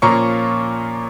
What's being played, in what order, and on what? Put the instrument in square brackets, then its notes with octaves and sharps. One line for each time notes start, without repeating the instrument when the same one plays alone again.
[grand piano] A#2 F3 A#3 C#4 F4 A#5 C#6